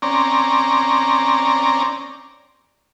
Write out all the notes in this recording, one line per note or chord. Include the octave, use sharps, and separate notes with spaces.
C4 C#4 D5 A#5